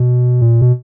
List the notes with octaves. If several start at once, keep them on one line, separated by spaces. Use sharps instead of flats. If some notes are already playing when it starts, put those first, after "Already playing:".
Already playing: B2
A#2
B2